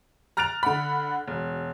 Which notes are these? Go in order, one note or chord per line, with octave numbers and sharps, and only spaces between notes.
A#5 F6 F#6 A6 D7 F7
D3 F#5 B5
E1